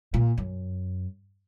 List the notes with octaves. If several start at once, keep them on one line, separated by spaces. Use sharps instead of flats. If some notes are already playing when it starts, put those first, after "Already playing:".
A#2
F#2